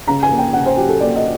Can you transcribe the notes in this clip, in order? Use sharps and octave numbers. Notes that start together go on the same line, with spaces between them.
C#3 A#5
G#5
A#3
G5
C#3 F#5
C5
F#3 G4
A4
A#3 D5
D#5